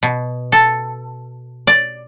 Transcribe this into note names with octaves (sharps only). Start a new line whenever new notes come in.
B2
A4
D5